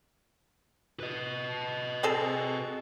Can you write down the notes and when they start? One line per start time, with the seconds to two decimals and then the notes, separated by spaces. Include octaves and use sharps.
1.00 B4 D#5
2.03 C4 G#4 A4